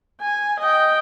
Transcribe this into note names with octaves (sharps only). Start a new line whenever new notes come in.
G#5
D#5 G5